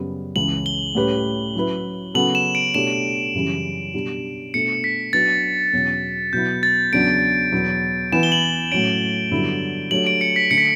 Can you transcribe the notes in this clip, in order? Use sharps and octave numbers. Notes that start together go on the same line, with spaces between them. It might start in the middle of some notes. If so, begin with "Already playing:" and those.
Already playing: F#2 C#3 G3 B3
C#2 C#3 E3 F#7
G7
A2 G3 C#4 G4 B4
F#3 C#4 E4 B4
C#3 F#3 B3 F#4 A4 F#7
E7
D7
B2 A3 D4 G4 C#5 E7
F#2 C#3 E3 G3
B2 G3 D4 G4
B2 A3 D4 A4 C#7
B6
F#3 B3 D4 F#4 B4 A6
E2 B2 F#3 C#4
B2 F#3 B3 E4 G6
A6
E2 C#3 F#3 B3 D4 D7
E2 B2 F#3 B3
E3 B3 E4 B4 E7
G7
F#7
A2 F#3 C#4 D7
G2 D3 F#3 B3 E4
F#3 A3 D4 G4 C#5 F#7
D7
C#7
B6
D3 A3 C#7
B6